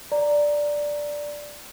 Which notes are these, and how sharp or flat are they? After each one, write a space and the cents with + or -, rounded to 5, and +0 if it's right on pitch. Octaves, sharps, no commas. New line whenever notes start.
D5 +0 A#5 -10